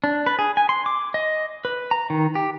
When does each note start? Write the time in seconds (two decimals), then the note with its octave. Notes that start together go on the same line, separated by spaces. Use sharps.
0.04 D4
0.27 B4
0.39 G#4
0.57 G#5
0.69 C6
0.86 D6
1.14 D#5
1.65 B4
1.91 A#5
2.10 D#3
2.35 G4